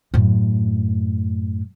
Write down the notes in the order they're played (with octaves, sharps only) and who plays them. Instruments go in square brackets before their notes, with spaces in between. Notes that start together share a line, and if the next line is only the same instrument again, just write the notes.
[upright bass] F#2 A2